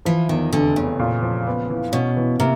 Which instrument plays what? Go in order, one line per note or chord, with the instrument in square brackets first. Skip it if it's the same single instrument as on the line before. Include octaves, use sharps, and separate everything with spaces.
[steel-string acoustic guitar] E3 [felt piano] F3
[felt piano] E2 [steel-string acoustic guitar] D#3
[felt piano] F1 [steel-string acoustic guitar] D3
[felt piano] E2 [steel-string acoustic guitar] C#3
[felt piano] A#2
F3
B3
E3
[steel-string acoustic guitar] B2 [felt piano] C#4
[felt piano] E3
[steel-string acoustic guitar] C3 [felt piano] A#3